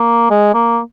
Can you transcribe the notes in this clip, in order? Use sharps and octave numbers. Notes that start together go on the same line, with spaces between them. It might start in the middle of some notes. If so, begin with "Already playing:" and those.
Already playing: A#3
G#3
A#3